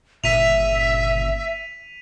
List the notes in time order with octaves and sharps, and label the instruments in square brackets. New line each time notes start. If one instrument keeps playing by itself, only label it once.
[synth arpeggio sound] G1 A#2 C#3 [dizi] E5 [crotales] B6 D#7 F7